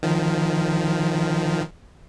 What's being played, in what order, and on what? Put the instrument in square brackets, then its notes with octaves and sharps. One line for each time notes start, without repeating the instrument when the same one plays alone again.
[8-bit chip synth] D#3 F3